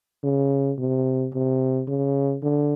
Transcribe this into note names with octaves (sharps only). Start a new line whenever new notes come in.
C#3
C3
C3
C#3
D3